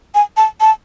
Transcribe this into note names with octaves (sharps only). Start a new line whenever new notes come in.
G#5
A5
A5